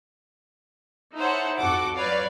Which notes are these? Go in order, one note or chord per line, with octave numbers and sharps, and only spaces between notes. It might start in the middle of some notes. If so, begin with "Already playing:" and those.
D#4 E4 A4 C5 C#5 F#5
F2 F#4 A4 F#5 D6
F#3 B4 C#5 D5 F5